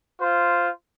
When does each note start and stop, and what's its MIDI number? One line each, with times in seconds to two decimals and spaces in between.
0.21 0.69 65
0.21 0.69 72